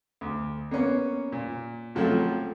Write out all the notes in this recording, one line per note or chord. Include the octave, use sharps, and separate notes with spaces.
D2
A#3 B3 C#4
A#2
C#2 F3 F#3 A3 C4